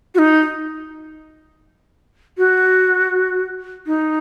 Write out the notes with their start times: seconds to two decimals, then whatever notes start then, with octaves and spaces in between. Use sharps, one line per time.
0.15 F#4
0.18 D#4
2.38 F#4
3.86 D#4